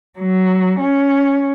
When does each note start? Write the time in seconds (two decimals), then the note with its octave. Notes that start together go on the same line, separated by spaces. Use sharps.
0.19 F#3
0.81 C#4